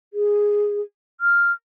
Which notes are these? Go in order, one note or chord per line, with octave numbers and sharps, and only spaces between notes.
G#4
F6